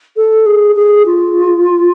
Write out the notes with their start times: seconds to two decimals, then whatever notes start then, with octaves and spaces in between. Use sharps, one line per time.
0.16 A4
0.46 G#4
0.75 G#4
1.06 F4